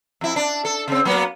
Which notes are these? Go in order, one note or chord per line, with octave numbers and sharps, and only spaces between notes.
F2 E4
D4
A4
C#3 C4
F#3 A#3 B3